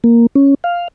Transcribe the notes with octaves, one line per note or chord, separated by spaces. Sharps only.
A#3
C#4
F5